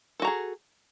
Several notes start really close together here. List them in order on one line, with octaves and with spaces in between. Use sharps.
A4 F#4 A#5 G#4